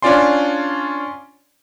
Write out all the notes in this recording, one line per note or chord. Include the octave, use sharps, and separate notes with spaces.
C#4 D4 F4 D5 G#5 C6